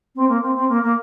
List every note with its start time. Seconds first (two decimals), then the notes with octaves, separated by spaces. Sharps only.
0.16 C4
0.29 A#3
0.42 C4
0.56 C4
0.69 A#3
0.83 A#3